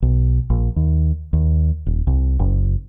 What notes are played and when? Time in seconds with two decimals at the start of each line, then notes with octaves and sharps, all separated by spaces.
0.02 B1
0.50 A#1
0.76 D#2
1.33 D#2
1.86 D#1
2.07 C2
2.39 F#1